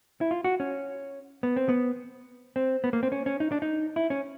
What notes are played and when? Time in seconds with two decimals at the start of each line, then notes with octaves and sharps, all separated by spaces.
0.21 E4
0.31 F4
0.44 F#4
0.60 C#4
1.43 B3
1.56 C4
1.69 B3
2.56 C4
2.84 B3
2.93 A#3
3.03 C4
3.12 C#4
3.26 C#4
3.40 D#4
3.52 D4
3.62 D#4
3.96 E4
4.10 C#4